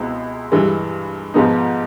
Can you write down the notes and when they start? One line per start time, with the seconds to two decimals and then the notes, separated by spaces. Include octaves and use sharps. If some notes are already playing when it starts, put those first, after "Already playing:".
Already playing: C#2 B2 G#3 C4 E4
0.52 G2 E3 G#3
1.34 G#2 F3 G#3 B3 D#4